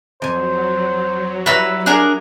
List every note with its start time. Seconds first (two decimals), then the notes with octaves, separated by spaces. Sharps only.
0.22 F2 F#3 C5 G#5
1.46 G3 E4 F#4 B4 A#5 E6
1.86 D4 G#4 A#4